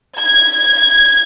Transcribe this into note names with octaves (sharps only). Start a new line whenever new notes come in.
G#6